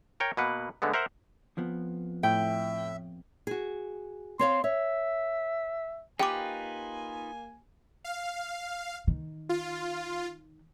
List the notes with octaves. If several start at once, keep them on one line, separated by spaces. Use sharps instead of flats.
A#4 C#5 G5 A#5
B2 A#3 B4 F#5
D3 G#3 A3 B3
A#4 C5 E5 F#5 A#5
F2 F3 B3
A2 E5 G5
F#4 G#4
C4 C#5 F5 C6
C#5 E5
A#3 D#4 F4 G4 B4 G5 G#5 D6
F5
D#3
F4